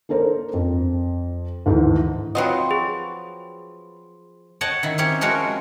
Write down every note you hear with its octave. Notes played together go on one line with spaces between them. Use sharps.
A#3 D4 A4 A#4 C5
F2
D2 G#2 D#3 E3
F3 F#3 C4 F4 F#4 B4 D#5 G5
G#4
C#5 D#5 F#5 G5 A5
D#3 E4
C4 C#4 G4 C#5
F3 G#3 C4 F#4 A#4 C#5